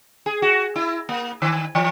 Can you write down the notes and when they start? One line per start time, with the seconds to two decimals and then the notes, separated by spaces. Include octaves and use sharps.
0.26 G#4
0.42 F#4
0.76 E4
1.09 A#3
1.42 D#3
1.75 E3